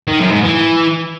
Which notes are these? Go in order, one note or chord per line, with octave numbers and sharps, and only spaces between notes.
D#3
F#2
G#2
E3